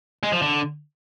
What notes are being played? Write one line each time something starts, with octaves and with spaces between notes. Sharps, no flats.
G#3
F3
D3